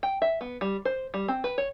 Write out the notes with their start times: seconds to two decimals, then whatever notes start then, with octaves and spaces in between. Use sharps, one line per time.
0.03 G5
0.22 E5
0.41 B3
0.61 G3
0.85 C5
1.14 G3
1.28 C4
1.44 B4
1.58 C#5